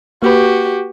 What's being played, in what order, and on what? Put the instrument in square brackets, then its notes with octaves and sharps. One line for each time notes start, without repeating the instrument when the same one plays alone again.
[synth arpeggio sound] A#3 B4 [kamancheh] F#4 G4